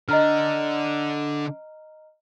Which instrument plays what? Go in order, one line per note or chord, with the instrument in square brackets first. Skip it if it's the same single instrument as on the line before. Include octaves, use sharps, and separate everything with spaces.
[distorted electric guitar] D3 [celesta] D#5 A#5 F6